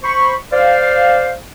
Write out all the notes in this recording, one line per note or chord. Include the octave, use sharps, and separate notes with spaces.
C5 B5 C#6
C5 D5 F5